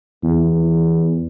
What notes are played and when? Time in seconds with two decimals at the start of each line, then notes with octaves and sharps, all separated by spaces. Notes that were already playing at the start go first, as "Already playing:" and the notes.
0.23 E2